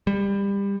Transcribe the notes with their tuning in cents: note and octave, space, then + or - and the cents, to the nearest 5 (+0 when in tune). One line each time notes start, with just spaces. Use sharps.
G3 +25